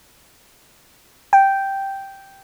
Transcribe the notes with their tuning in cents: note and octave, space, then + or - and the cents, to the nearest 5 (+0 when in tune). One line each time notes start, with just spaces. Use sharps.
G5 -5